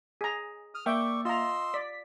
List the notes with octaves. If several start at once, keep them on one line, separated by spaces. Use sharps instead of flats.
G#4 A#5
D#6 F6
A#3 D5 E5 G5 C#6
F4 D#5 A#5 C6 E6
D5 B6